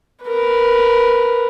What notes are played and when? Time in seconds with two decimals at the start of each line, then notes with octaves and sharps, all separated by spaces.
0.25 A#4 B4